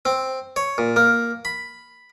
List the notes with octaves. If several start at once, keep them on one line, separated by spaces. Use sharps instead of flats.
C4
C#5
A#2
A#3
B5